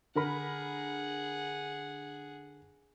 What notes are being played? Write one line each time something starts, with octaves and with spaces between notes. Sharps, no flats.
D3 G#4 A#4 F#5 B5